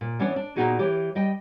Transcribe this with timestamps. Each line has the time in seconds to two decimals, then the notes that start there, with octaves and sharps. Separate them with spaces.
0.01 A#2
0.19 E3 B3 C#4 D4 C#5
0.36 D4
0.56 A#2 F3 B3 D#4 F#4 G#4
0.79 E3 G4 C#5
1.15 G3 D#5 G5